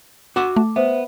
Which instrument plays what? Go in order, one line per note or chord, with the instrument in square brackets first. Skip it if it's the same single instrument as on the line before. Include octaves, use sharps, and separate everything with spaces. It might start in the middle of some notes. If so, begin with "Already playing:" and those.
[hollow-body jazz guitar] F#4 E5 F#5 [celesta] D6
[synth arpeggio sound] A3
[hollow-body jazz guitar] B3 [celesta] C5 E5